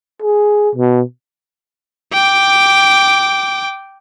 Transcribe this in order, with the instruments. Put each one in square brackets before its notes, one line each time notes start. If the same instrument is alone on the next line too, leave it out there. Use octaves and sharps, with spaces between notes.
[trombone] G#4
B2
[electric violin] G5 D6